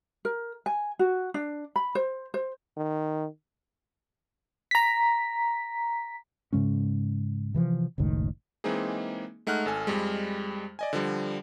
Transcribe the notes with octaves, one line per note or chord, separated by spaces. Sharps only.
A#4
G#5
F#4
D4
B5
C5
C5
D#3
A#5 B6
G#2 C#3 G#3 C#4
C3 E3 F3
F#1 C#2 A2 D#3
E3 G#3 A#3 C4 D#4 G#4
G#3 A3 D#4 F#5 F6 F#6
G#1 A4 G#5
F2 G3 G#3
D5 D#5 G#5
D3 F3 G3